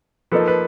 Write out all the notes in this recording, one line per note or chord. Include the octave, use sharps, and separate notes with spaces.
F3 A#3 D#4 A4 B4
B4